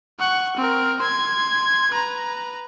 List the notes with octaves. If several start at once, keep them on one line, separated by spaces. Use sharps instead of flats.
F#5 C#6
C4 A#4
C6 G#6
B4 A#5